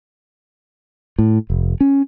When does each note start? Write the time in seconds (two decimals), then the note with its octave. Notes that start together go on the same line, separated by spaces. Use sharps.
1.19 A2
1.50 F1
1.81 C#4